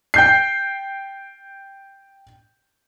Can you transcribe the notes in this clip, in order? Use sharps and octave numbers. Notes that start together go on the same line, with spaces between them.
G5 G6 C7